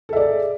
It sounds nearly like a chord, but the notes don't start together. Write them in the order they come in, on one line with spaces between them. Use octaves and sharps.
A4 E5 D5 G#4